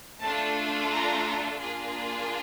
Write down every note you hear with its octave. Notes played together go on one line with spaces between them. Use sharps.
A3 D4 F4 A4 A5
A#5
A#3 D4 F4 G#4